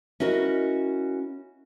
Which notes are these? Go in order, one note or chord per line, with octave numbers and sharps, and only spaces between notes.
C#4 E4 F#4 A#4 D#5